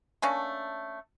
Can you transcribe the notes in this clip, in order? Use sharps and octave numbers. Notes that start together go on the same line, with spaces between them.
A3 A#3 C#4 D4